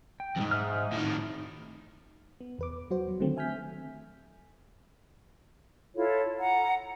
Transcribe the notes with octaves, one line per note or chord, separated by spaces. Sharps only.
G5
F2 G#2
D#4 E5 F6
A2 D#3
B3
E2 B4 D6
F#3 F#4 C5
F#3
D3 D#3 F#3 A3 C4
E5 G#5 F6 G6 B6
E4 F4 A4 C#5
F#5 A#5